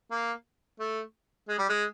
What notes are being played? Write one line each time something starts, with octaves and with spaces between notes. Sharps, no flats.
A#3
A3
G#3
G3
G#3